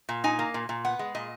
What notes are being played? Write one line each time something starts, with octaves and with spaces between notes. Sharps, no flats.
A#2
D#4 G#5
A#3
A#2
A#2
B3 F#5
G#3
A#2 D#5